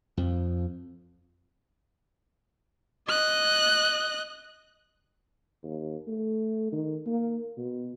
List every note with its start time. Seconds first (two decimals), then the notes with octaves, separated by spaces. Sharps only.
0.17 F2 F3
3.08 D#5 F#6
5.63 D#2
6.07 A3
6.72 D#3
7.06 A#3
7.57 B2